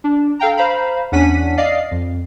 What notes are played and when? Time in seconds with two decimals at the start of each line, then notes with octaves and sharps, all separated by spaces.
0.04 D4
0.39 A4 F5 G5 A#5
0.57 C5 F5 A#5 B5
1.12 E2 C#4 D4 F#5 B6 D#7
1.57 D5 D#5 F5 C7
1.91 F2